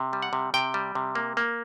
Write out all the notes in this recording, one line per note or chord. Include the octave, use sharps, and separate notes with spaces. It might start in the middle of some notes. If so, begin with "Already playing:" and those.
Already playing: C3
G3
F#5
C3
C3 G5
G3
C3
A#3
A#3